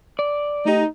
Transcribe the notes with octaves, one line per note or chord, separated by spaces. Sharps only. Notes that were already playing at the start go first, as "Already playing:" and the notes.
D5
A3 D#4 G4